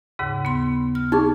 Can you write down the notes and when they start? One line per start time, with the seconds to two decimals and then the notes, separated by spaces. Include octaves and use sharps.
0.19 D#2 G#2 C#3
0.45 B3 C6
0.95 F6
1.12 D#4 G#4 C#6 G#6